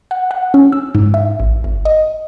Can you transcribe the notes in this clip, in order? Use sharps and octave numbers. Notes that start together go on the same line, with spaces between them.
F#5
F#5
C#4
E6
G#2
E5
A1
G1
D#5